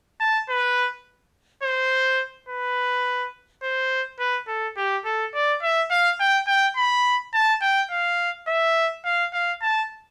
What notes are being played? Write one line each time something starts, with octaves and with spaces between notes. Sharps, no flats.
A5
B4
C5
B4
C5
B4
A4
G4
A4
D5
E5
F5
G5
G5
B5
A5
G5
F5
E5
F5
F5
A5